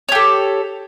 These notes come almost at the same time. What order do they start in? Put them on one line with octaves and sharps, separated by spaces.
C#5 G4 A4